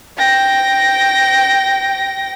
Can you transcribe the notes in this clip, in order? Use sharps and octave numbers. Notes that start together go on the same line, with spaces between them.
G5 A#6